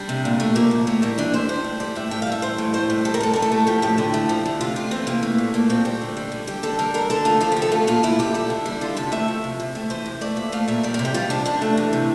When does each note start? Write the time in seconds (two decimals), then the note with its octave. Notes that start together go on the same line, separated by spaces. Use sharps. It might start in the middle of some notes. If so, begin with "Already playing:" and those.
Already playing: G3 D4
0.09 C3
0.25 A#2
0.40 A3
0.55 F3 A#3
0.71 A#2
0.87 A2 A3
1.02 G3 A#3
1.18 E3 D4
1.34 A2 C5
1.49 G3 C5
1.64 A2
1.80 G3 D5
1.95 A2 E5
2.11 A2 G5
2.22 F5
2.27 G3
2.32 E5
2.42 E3 C5
2.58 A2
2.74 G3 C5
2.90 A2
3.05 G3 A4
3.14 A#4
3.20 A2 A4
3.33 A2 A#4
3.42 A4
3.52 A3
3.67 F3 G4
3.82 A2 G4
3.98 D3
4.14 A3
4.29 F3
4.46 D3
4.61 C3 F4
4.76 A3 F4
4.91 E3 C4
5.07 C3 A#3
5.23 A3
5.38 A#2
5.54 A3 A#3
5.70 A#2 C4
5.85 G3 G4
6.01 D3
6.17 G3
6.32 D3
6.47 G3 G4
6.63 D3 A4
6.79 G3 A#4
6.94 D3 A#4
7.10 D3 A4
7.25 A3 F4
7.40 F3 F4
7.52 G4
7.56 D3
7.62 A4
7.72 A3 F4
7.87 A#2 F4
8.03 A3 E4
8.19 A#2 G4
8.34 G3 A4
8.50 D3
8.66 G3 E4
8.81 D3 F4
8.97 C3 A4
9.12 A3 E5
9.28 F3
9.44 C3
9.60 C3
9.75 A3
9.90 E3 C5
10.06 C3
10.21 A3 D5
10.36 A#2 E5
10.52 A3 F5
10.68 A#2 E5
10.83 G3 D5
10.94 A#4
10.99 C3
11.05 G4
11.14 G3 F4
11.30 C3 D4
11.46 C3 D4
11.62 A3
11.77 E3
11.93 C3